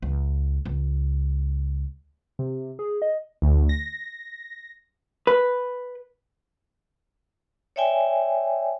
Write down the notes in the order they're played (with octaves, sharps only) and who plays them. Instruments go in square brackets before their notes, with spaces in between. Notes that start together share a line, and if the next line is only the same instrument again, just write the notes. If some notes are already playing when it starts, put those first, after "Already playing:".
[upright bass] C#2
C#2
[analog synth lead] C3
G#4
D#5
[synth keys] D2
A#6
[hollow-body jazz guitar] B4
[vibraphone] C#5 D5 E5 G5 G#5